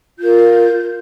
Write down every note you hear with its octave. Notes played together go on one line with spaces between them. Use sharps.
F4 A#4 G6